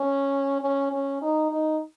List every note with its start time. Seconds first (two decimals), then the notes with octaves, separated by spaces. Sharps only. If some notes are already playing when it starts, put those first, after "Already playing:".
Already playing: C#4
0.62 C#4
0.92 C#4
1.22 D#4
1.51 D#4